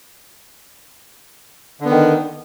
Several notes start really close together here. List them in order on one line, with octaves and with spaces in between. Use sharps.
D3 B3 D#3